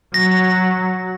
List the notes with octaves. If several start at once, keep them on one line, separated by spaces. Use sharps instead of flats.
F#3 A#6